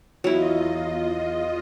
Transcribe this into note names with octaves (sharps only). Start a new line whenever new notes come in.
E2 F#3 E4 F4 D#5